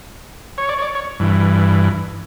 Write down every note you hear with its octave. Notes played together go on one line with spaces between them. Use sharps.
C#5
D5
C#5
D5
C#5
G2 E3